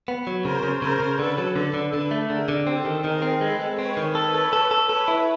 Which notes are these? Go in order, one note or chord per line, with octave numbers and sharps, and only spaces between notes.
B3
F#3
C#3 A#4 C5
C#3
C#3 A#4 C5
C#3
D3 A4 B4
F#3
D3 A4 B4
D3
D3 A4 B4
A3
D3 G#4 A#4
D3
C4 G4 A4
D#3
D#3 G#4 A#4
C4
G#3 A4 B4
G#3
C4 B4 C#5
D#3
A4 B4 C#5
A4
A4
A4
A4 B4 C#5
E4